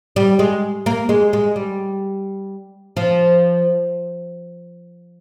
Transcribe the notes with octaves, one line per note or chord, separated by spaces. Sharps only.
G3
G#3
A#3
G#3
G#3
G3
F3